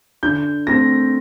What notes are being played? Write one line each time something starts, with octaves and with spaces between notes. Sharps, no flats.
D3 G6
A3 C4 A#6